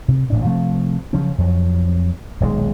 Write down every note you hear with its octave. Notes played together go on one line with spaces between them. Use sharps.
C3
A1 A2 D4
C3 F3 A3 C4
C#3 F3 F#3 C#4
F2 F3 F#3
D#1 B1 B2 G#3